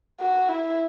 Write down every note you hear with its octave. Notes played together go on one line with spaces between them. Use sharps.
F#4
E4